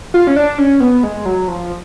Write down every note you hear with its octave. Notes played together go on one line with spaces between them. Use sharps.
F4
C#4
D4
C#4
B3
G#3
F#3
F3